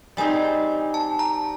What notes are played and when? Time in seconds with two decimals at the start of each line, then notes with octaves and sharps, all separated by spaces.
0.17 G3 C4 D#4 G#4 C5 G#5
0.94 A5
1.19 A#5